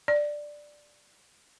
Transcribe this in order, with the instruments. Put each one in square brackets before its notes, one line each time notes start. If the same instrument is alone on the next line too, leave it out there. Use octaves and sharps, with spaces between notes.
[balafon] D5